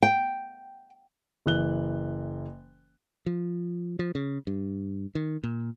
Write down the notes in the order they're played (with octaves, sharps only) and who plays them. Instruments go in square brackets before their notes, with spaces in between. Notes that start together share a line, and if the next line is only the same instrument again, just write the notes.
[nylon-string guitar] G5
[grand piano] F#1 E3 F#6 G7
[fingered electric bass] F3
F3
C#3
G2
D#3
A#2